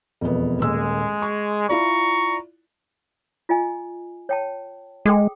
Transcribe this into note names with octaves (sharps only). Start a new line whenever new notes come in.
E1 F2 B3
D#1 G#3 A#3 E6
C#6
E4 F4 D5 A#5 C#6
F4 D#5 G#5
C#5 G5 A5
G#3 G#4 A4 G5